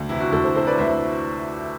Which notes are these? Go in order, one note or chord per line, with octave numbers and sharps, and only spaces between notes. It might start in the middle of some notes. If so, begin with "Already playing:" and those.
Already playing: D2
C3 E3 E4
D4 F#4
D2 F#4 A4
A4 C5
C3 E3 A4 C5
B4 D5
D2 C5 E5